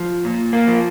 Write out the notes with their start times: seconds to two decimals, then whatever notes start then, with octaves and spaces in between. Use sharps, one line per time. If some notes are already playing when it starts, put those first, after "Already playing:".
Already playing: F3
0.25 A#2
0.53 A#3
0.67 F3